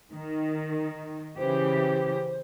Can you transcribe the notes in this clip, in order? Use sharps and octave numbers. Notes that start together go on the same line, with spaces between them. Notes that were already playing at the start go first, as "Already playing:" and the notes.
D#3
C#3 E3 G4 C5